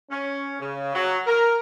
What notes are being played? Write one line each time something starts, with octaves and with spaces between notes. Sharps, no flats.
C#4
C#3
F#3
A#4